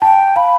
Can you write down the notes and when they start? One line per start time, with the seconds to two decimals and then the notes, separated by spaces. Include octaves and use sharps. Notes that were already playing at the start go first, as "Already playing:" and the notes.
0.02 G5 A5
0.36 F5 B5